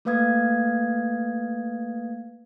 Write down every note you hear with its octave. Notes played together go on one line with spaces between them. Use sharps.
A3 A#3 B4 F5 D#6 G#6